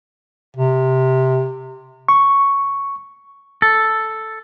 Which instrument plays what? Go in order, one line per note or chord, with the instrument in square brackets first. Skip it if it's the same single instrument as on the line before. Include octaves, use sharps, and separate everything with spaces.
[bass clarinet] C3
[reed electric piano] C#6
[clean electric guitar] A4